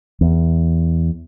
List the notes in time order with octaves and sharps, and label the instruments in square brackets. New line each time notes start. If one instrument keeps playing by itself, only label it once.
[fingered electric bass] E2